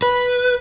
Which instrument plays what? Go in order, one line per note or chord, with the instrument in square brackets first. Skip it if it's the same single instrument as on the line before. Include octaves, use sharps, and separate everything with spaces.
[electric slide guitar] B4